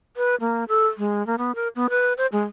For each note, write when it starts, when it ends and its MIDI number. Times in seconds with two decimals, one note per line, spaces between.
0.17 0.35 71
0.41 0.64 58
0.68 0.87 69
0.98 1.25 56
1.27 1.36 58
1.38 1.52 59
1.55 1.68 70
1.76 1.87 59
1.90 2.13 71
2.18 2.27 72
2.32 2.44 56